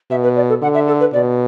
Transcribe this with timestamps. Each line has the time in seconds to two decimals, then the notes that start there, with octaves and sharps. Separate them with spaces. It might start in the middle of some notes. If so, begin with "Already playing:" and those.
0.11 B2 E5
0.23 B4
0.36 D5
0.49 A4
0.62 D3 F#5
0.74 E5
0.88 A4
1.00 B4
1.13 B2 D5